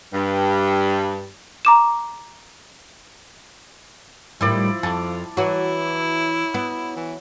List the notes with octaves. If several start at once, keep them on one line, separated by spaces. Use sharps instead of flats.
G2
A#5 D6 E7
A2 D#3 F3 G3 E4 D5 B5
F2 A5
E3 F#3 E4 F#4
B3
E3